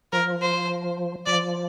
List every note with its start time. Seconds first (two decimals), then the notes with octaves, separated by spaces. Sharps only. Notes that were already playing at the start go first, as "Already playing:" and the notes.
0.12 F3 A#4
0.41 C5
1.26 F3 D5